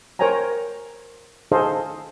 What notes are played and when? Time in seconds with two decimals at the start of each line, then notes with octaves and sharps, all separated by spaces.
0.19 A#4 C5 C#5 G5 G#5 A#5
1.52 D#4 G#4 A4 C5 D#5 F5